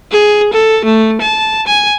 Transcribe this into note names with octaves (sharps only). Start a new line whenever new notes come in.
G#4
A4
A3
A5
G#5